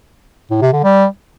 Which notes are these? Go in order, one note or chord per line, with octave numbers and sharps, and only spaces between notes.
A2
C3
D3
G3